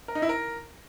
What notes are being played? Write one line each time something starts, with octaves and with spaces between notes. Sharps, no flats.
A#4
D#4
E4
A#4